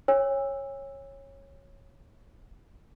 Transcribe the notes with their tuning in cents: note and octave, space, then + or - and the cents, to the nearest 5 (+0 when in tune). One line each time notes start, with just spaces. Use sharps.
C#5 -10 G#5 -40 E6 +0